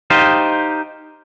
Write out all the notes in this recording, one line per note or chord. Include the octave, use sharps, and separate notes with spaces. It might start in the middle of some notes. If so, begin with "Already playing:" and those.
D#4 G4 C5 F5